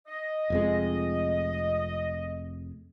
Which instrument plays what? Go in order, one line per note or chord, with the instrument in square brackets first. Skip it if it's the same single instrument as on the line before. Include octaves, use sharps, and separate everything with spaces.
[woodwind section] D#5
[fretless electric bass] F1 F2 G#3